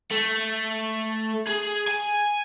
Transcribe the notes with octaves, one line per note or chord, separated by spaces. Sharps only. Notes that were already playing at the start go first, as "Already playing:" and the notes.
A3
G#4
G#5